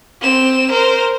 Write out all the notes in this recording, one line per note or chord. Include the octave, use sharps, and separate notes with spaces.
C4 E7
A#4 C5